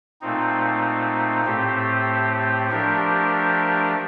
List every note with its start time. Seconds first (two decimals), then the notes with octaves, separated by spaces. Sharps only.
0.21 A#2 A3 C4 D#4
1.45 A2 A3 C4 G4
2.70 F3 A3 D4 G4 A#4